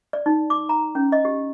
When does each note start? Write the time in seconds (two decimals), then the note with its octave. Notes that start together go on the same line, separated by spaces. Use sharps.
0.13 D5
0.26 D#4
0.50 D6
0.69 A#5
0.95 C#4
1.12 D#5
1.25 G4